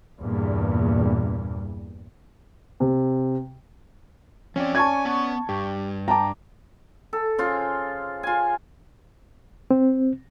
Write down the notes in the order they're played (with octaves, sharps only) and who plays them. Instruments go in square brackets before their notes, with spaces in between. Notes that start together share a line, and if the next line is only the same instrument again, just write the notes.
[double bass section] E2 G2 A#2
[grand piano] C3
[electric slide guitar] F3 C4 [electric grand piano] C#4 D5
[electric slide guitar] G#5 [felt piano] A5 C#6 G#6
[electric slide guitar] B3
[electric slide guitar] G2 [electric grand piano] G4
[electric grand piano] G5 D6 [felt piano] A5 A#5
[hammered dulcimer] A4
C#3 F4 C5
F4 G#5
[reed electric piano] C4